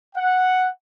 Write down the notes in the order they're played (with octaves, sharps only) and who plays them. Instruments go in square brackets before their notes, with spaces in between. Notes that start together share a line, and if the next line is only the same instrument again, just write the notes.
[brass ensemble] F#5